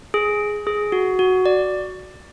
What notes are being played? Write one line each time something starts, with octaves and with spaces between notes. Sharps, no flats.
G#4
G#4
F#4
F#4
D5